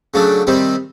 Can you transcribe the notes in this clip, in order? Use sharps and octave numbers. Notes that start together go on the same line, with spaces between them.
C#3 F#3 A3 D4
C3 D#3 G3 C4